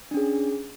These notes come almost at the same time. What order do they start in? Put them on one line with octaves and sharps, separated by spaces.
D4 C#4 G#4